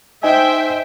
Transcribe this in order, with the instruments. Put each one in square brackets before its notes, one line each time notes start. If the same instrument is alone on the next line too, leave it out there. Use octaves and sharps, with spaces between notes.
[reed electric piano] D#4 D#5 G#5 [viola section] C5 E5 G5